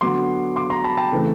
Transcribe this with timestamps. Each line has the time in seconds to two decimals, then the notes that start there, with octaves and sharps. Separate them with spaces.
0.01 D3 F#3 B3 C6 D6
0.56 C6 D6
0.70 A#5 C6
0.84 A5 B5
0.97 G5 A5
1.12 C#3 E3 A3 C4